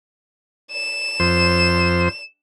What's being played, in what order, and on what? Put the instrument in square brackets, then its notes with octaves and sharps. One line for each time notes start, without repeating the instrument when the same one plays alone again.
[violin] E7
[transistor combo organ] F2 C5